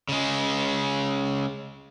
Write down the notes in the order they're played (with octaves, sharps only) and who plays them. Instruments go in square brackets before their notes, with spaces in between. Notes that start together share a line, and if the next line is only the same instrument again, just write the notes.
[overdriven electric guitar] C#3 G#3